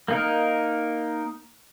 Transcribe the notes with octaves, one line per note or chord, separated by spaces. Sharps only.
A#3 D#4 A#4